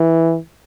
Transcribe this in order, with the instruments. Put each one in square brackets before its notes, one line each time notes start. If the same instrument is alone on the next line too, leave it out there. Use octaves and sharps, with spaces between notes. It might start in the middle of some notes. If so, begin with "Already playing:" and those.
Already playing: [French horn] E3